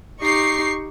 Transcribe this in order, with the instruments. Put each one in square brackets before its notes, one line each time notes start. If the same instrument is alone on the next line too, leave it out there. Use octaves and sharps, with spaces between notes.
[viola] D#4 G4 [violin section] C#6 C7